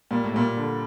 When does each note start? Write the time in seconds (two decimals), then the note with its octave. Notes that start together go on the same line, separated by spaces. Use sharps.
0.11 A#2 G3
0.24 A2
0.34 A#2 G3
0.57 D3